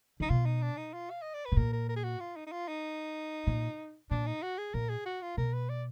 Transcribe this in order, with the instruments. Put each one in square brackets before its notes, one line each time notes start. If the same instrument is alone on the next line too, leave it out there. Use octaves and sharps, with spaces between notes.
[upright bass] D3 [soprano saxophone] D#4
[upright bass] B2 [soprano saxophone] F4
[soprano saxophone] D#4
D4
D#4
F4
F5
D#5
D5
B4
[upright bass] B2
[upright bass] A#2 [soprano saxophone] A#4
[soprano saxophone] A#4
A#4
G#4
F#4
F4
D#4
D#4
F4
D#4
[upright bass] A#2
[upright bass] A#2 [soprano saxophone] D4
[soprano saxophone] D#4
F#4
G#4
[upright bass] A#2 [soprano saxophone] A#4
[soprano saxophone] G#4
F#4
F4
[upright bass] B2 [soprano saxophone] A#4
[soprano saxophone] B4
D5